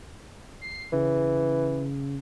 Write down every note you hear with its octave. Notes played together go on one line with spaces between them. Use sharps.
C7
C#3 E3